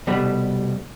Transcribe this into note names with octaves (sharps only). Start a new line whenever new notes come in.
C2 B2 G3 A3 B5